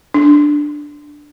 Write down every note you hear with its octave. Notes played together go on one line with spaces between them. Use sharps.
D4